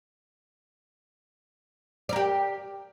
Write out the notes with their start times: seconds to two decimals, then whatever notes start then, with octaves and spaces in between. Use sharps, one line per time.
2.09 D5
2.13 A#4
2.16 G4